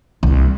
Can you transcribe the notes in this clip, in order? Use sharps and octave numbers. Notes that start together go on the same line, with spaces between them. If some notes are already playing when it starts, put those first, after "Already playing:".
C2